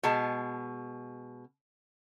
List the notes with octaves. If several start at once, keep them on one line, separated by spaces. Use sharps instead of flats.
B2 G#3 A5